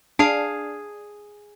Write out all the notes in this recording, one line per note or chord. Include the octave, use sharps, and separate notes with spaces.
D4 G#4 F5